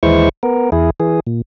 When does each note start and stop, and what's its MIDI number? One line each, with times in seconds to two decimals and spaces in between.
0.03 0.29 39
0.03 0.29 52
0.03 0.29 56
0.03 0.29 64
0.03 0.29 72
0.03 0.29 85
0.43 0.70 59
0.43 0.70 70
0.72 0.90 40
0.72 0.90 64
0.72 0.90 68
1.00 1.20 52
1.00 1.20 68
1.27 1.41 46